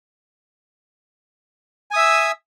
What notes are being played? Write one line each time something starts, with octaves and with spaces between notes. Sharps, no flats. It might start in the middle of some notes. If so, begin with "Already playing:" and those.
E5 G#5 D#6 E6